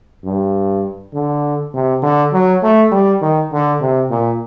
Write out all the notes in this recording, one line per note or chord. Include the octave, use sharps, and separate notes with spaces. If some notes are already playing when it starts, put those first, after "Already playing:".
G2
D3
C3
D3
F#3
A3
G3
D#3
D3
C3
A#2